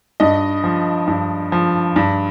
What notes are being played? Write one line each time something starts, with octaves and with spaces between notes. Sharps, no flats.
G2 D#5
F3
G2
F3
G2